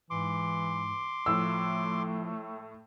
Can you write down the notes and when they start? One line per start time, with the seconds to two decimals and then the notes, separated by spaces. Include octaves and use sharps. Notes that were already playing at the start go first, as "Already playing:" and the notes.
0.11 G#2 E3 C6 D6
1.26 A2 F3 A3 E6